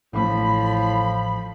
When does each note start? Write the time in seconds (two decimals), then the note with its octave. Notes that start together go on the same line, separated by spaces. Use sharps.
0.13 A1 A2 F3 A3 B5